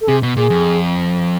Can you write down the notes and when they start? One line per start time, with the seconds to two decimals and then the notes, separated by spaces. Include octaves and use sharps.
0.01 A4
0.08 C3 G#4
0.23 B2
0.37 A#2 G#4
0.50 F2